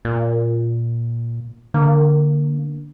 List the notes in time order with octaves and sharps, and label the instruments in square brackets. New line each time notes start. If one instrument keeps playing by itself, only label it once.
[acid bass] A#2
[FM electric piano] D3 [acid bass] A#3